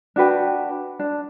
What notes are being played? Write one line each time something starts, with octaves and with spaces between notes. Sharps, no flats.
D4 F#4 B4 G5
D4